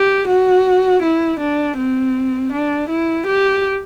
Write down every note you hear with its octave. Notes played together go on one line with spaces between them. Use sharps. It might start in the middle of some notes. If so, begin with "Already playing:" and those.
Already playing: G4
F#4
E4
D4
C4
D4
E4
G4